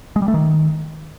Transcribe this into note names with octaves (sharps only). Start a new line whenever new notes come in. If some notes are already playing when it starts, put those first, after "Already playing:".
G#3
G3
A3
D#3